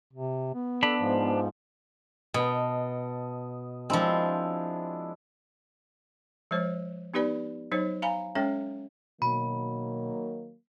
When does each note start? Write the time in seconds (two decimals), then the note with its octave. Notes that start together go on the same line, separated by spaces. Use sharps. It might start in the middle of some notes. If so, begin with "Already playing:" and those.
0.13 C3
0.54 B3
0.83 D4 A4 B5
1.00 G#2 F3
2.34 B2 D#5 A5
3.90 F3 G#3 C4 D4 E4
6.51 F3 G#3 C5 C#5
7.14 B3 D#4 G4 B4 D5 B5
7.72 F#3 D#4 C5 C#5
8.02 F5 G#5 A#5 B5
8.35 G#3 C#4 A4 C#5 G5
9.22 B2 D#3 F#3 A#3 B5